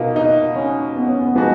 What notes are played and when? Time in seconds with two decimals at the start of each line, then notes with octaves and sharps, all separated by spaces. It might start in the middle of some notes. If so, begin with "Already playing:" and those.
Already playing: B2 A#3 D#4 F4 B4
0.16 D#4
0.56 C#4
0.96 B3
1.08 C#4
1.21 B3
1.35 F3 G#3 B3 D#4 F#4